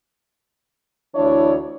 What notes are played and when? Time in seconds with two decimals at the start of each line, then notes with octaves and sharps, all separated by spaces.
1.15 D2 E3 D4 E4 C#5 D5